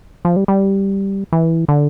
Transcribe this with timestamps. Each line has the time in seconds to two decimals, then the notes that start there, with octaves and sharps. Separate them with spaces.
0.25 F3
0.36 G3
0.48 G3
1.33 E3
1.68 D3